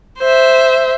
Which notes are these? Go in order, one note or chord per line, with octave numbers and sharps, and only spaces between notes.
C5 E5